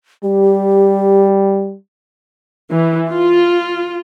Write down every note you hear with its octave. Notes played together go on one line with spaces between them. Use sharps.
G3 G4
E3
F4